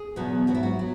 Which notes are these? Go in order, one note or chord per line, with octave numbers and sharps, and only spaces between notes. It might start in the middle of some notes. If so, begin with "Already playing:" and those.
Already playing: G#4
E2 B2 F#3 B3
G#2 F#3 B3 F#4
E4
F#4
F#3 B3